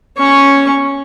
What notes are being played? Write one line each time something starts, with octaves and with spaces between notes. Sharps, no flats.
C#4 C#6